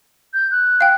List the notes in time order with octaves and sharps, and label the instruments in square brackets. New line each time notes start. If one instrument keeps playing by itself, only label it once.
[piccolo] G6
F#6
[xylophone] F5 G5